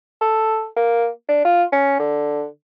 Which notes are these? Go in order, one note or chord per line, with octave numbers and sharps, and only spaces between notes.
A4
A#3
D4
F4
C#4
D3